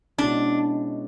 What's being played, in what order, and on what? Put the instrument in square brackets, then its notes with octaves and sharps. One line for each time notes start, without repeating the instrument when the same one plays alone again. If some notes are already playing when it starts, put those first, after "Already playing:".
[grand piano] B2 G#3 C#4 E4 [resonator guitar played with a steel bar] D4